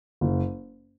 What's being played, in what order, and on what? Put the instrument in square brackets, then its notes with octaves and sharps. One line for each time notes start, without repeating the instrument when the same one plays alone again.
[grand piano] F#1